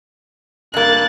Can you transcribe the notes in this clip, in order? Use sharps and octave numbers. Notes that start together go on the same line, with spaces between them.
G2 A#3 F#6 A6